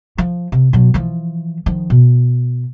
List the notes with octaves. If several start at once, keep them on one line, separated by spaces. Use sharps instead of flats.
F3
C3
B2 F#3
E3 F3
D#3 F3
B2